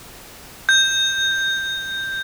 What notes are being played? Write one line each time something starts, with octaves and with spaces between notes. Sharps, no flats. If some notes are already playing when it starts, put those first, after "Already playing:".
G6